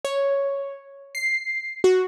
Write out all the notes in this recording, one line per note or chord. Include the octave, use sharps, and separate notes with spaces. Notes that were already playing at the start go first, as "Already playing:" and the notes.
C#5
C7
F#4